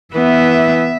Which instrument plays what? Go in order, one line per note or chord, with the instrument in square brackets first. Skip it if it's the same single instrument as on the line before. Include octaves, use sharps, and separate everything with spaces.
[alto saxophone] E3 [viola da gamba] B3 [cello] E5